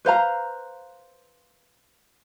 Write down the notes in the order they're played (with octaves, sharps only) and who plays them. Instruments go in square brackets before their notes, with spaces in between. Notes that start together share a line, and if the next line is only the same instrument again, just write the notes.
[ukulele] B4 C5 F5 A#5